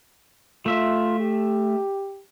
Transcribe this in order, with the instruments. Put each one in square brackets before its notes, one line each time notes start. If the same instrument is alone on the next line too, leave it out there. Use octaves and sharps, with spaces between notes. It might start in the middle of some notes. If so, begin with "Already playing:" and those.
[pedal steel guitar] A3 E5 [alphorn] F4
[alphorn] G4